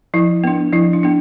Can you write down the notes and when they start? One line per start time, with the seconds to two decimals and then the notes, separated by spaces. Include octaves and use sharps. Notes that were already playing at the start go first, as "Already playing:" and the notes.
0.14 F3 E4
0.44 B3 D4
0.72 F3 E4
0.93 D4
1.03 B3 D4